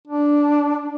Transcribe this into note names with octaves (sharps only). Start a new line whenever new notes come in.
D4